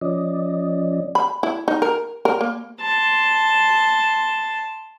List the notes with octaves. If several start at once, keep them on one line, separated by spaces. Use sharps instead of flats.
F3 C#4 D5 D#5
B5
E4
D#4
A#4
A#4
A#3
A5 C6